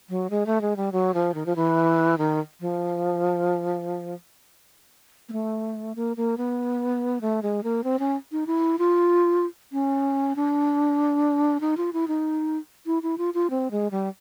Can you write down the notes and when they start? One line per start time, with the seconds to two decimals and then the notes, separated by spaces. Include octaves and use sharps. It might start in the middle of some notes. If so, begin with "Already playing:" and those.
0.09 F#3
0.30 G#3
0.46 A3
0.61 G#3
0.76 G3
0.92 F#3
1.14 F3
1.34 D#3
1.46 F3
1.56 E3
2.18 D#3
2.60 F3
5.29 A#3
5.33 A3
5.95 A#3
6.17 A#3
6.38 B3
7.21 A3
7.43 G#3
7.64 A#3
7.84 C4
7.99 C#4
8.32 D#4
8.47 E4
8.79 F4
9.72 C#4
10.36 D4
11.61 D#4
11.77 F4
11.93 E4
12.08 D#4
12.86 E4
13.03 E4
13.18 F4
13.34 F4
13.50 C4
13.71 G#3
13.91 G3